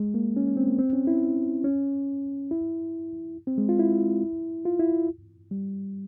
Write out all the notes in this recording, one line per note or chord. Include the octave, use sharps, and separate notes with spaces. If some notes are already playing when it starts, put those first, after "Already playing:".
Already playing: G#3
A#3
C#4
C#4
C4
A#3
C4
C#4
E4
C#4
E4
C4
G#3
F4
E4
F4
E4
G3